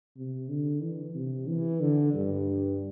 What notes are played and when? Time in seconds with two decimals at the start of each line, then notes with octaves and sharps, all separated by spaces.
0.16 C3
0.49 D3
0.82 E3
1.15 C3
1.47 E3
1.81 D3
2.13 G2